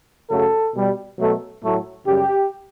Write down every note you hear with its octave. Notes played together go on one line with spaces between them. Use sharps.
F#2 C#3 F#3 A3 A4
B2 G3
B2 F#3 A3
A2 F#3 A3
F#2 C#3 G3 G4